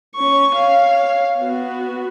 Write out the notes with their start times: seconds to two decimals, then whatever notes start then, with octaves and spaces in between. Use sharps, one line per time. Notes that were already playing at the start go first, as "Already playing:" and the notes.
0.15 C#4 C#6
0.55 C#5 F5
1.40 B3 F#4